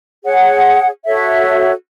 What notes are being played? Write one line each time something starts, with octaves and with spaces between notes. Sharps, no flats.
G#4 C#5 F#5
F#4 A4 C#5 E5